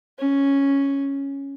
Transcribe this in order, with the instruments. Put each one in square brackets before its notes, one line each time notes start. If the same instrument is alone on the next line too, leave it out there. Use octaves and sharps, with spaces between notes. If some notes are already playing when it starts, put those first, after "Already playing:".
[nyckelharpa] C#4